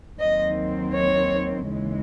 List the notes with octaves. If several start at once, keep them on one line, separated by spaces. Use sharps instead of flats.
D#2 D#3 F#3 C4 D#5
C#5
D#2 C#3 E3 G#3